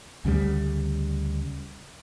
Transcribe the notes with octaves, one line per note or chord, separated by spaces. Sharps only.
D2 C#3 E3 G3